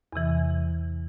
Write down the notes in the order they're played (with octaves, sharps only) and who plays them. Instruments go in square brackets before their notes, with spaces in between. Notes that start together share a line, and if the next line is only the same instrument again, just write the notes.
[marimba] E2 C3 E3